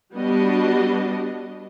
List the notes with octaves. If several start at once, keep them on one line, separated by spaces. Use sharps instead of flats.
G3 B3 D4 F#4 D#5